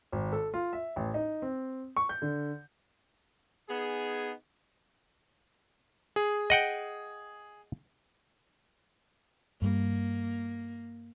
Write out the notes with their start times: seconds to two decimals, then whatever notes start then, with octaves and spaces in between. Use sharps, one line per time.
0.12 G#1
0.32 A4
0.54 F4
0.73 E5
0.96 A1
1.14 D#4
1.42 C4
1.97 C#6
2.09 G6
2.22 D3
3.69 B3 D#4 G#4
6.16 G#4
6.50 D#5 F#5 G5
9.62 G2 G3 A#3